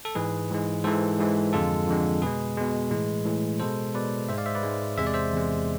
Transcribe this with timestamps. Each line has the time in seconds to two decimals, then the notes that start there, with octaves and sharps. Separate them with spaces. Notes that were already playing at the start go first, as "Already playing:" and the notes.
0.05 A4
0.15 G#2 E3 G#3 G#4 B4
0.50 G#2 E3 G#3
0.84 G#2 E3 G#3 A4 C5
1.19 G#2 E3 G#3
1.53 F2 D3 G#3 F4 A4
1.88 F2 D3 G#3
2.22 B2 G#3 G#4 B4
2.57 B2 G#3
2.91 A2 E3 G#3
3.25 A2 E3 G#3
3.60 B2 G#3 A4 C5
3.95 B2 G#3 B4 D5
4.29 G#2 C5 E5
4.32 G#3
4.38 D5 F5
4.46 C5 E5
4.55 B4 D5
4.63 G#2 G#3
4.98 E2 C3 G#3 E5
5.07 D5
5.14 C5 E5
5.33 E2 C3 G#3